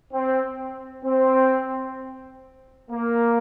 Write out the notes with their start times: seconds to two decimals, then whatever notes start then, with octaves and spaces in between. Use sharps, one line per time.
0.12 C4
1.04 C4
2.89 A#3